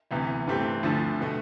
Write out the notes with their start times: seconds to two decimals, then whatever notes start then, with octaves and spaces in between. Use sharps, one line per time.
0.11 D2 C3 E3 B3
0.47 G2 E3 A3 C4 G4
0.83 D2 D3 F3 A3
1.21 B2 A3